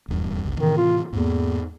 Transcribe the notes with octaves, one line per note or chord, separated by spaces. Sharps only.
D#1 E2 G2
G1 C#2
A2 C3 D#3 E3
F4
E2 G#2 A#3